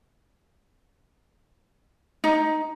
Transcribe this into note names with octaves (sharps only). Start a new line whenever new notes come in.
D#4